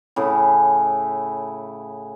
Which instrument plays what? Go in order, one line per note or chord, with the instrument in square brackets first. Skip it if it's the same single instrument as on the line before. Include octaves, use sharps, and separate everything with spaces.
[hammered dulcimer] A2 C#3 E4 G#4